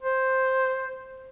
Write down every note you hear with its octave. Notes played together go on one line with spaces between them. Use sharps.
C5